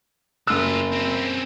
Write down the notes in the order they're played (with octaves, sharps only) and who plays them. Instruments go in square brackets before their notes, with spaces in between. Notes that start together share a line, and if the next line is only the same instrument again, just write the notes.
[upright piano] F#1 E6 [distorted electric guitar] A3 F4
[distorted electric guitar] C4 C#4